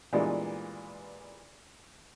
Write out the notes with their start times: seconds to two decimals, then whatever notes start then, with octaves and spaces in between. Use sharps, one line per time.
0.13 A#2 E3 G3 G#3 B3 D4